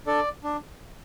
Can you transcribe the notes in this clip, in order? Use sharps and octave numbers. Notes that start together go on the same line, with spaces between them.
D4 A4 D5
D4